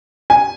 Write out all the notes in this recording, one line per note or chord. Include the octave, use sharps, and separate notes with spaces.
G#5